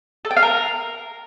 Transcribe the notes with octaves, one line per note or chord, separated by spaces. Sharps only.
A4
G5
F5
A#4